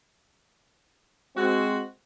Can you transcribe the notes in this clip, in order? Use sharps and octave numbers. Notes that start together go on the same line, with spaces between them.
G#3 C4 F#4